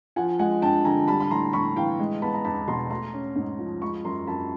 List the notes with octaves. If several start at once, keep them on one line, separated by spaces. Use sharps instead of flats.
F3 F#5 G#5
G#3 F#5 G#5
G2 G5 A5
D3 G#5 A#5
G3 A5 B5
B5
A2 A#5 C6
A2 B5 C#6
E3 F5 G5
G#3
B3 A5 B5
A#5
E2 A5 B5
B2 A#5 C6
A3 A#5 C6
C#4
G#2
F3
G#3 B5 C#6
F#2 A#5 C6
F#2 A5 B5